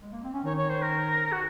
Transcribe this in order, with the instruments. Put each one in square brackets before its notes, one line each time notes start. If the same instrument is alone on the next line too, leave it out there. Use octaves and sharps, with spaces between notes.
[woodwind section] G#3
A#3
C4
C#4
[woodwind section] D#3 D#4 [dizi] C#5
[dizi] C#5
C5
A#4
F#4